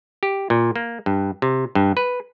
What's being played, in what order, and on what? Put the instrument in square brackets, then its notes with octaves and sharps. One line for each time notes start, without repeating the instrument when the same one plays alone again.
[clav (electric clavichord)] G4
A#2
A#3
G2
C3
G2
B4